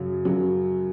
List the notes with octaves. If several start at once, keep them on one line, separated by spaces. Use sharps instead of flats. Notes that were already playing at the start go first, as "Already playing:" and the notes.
Already playing: F#2 C#3 F#3
F#2 C#3 F#3